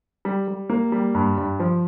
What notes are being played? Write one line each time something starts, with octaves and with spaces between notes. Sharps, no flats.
G3
G3
A#3
G3
G2
G2
F3